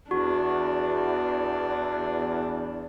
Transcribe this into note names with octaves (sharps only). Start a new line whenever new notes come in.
E2 D4 F#4